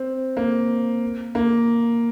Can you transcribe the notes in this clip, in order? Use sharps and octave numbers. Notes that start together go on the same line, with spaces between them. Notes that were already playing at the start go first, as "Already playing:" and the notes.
Already playing: C4
A#3
A#3